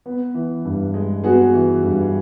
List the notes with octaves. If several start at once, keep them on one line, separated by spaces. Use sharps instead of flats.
B3
E3
G2
G#3
B3 F#4 G#4
E3
G2